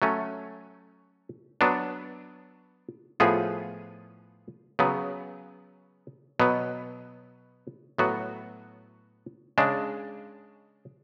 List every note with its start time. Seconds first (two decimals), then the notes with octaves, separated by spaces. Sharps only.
0.02 F#3 A3 C#4
1.61 F#3 B3 D4
3.20 A2 F3 B3 F4 G#4
4.79 C#3 F#3 B3
6.40 B2 F#3 B3
7.98 A2 F#3 B3 F#4
9.58 C#3 G#3 D4